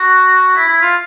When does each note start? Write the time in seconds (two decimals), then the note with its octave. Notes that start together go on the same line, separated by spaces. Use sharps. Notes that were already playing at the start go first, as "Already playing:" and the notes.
Already playing: F#4
0.56 E4
0.68 E4
0.81 F4